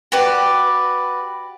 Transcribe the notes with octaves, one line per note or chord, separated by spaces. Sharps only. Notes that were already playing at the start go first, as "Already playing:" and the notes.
F#4 G4 B4 D5